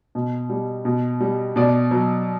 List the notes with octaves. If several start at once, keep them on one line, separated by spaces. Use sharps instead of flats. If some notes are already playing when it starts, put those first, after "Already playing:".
B2
G3
B2
G3
B2 D5
F#3